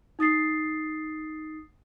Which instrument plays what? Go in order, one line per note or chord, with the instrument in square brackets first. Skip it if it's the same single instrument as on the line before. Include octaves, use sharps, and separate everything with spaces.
[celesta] D#4 D#6 A6 C7